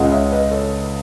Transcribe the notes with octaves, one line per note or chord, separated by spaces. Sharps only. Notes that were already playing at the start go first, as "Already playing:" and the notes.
Already playing: C#2 C#3 G#3 D#5 F#5
C#5 E5
B4 D#5
A4 C#5